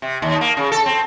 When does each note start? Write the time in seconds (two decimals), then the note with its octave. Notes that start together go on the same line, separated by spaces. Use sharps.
0.02 C3
0.22 D#2
0.41 A#3
0.57 C#3
0.72 A4
0.86 C4